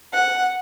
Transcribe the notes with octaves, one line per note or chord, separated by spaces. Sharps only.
F#5